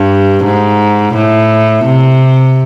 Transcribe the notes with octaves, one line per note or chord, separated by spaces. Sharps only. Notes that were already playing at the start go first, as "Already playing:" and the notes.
Already playing: G2
G#2
A2
C3